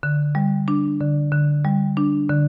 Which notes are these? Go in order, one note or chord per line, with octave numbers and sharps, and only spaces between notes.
D3
G3
D4
D3
D3
G3
D4
D3